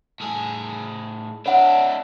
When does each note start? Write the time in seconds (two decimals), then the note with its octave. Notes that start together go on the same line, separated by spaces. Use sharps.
0.20 A2 G#4
1.46 D4 E4 C#5 F#5